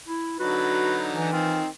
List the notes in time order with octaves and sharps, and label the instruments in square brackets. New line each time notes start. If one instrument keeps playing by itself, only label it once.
[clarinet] E4
[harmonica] D3 F#3 D#4 [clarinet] F#4 [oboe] B4
[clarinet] E3
[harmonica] D#3 C4 [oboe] F4